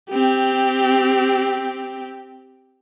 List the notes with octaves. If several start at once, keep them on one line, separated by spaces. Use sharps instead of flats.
C4 G4